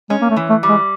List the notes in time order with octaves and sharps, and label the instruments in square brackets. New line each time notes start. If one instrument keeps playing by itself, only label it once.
[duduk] G#3 [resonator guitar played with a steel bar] C#4
[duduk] A#3
A3
[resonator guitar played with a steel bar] E3
[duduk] A3
[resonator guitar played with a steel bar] G3
[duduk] G#3